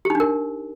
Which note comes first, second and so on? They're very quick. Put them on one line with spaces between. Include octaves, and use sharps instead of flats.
G4 D#4 D4 A#4